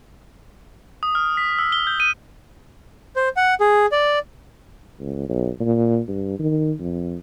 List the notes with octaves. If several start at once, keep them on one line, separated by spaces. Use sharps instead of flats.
D#6
F6
B6
E6
G7
G6
D#7
C5
F#5
G#4
D5
C#2
B1
A#2
G2
D#3
F2